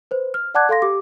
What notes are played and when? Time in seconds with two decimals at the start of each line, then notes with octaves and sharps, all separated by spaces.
0.11 B4 C5
0.34 F6
0.54 D5 F#5 A5 D6 F#6 G#6
0.69 A4 F5 C6 A#6
0.82 G4 D6